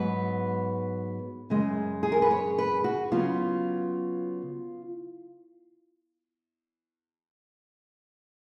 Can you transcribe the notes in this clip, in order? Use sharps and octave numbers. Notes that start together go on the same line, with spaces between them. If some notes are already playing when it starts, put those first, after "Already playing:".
Already playing: G#2 F#3 B3 B4
F#2 C#3 G#3
G#4
A#4
B4
C#5
B4
F#4
C#3 F#3 B3 F4